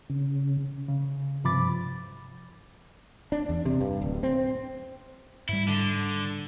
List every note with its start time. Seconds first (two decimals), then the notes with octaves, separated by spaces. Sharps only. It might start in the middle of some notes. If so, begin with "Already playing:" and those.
0.10 C#3
0.88 C#3
1.44 G2 C3 F3 B5 D6 A6
3.32 D4
3.49 E2
3.65 C3
3.81 G2
4.02 D1
4.23 C4
5.49 G#2 G3 E4
5.68 D3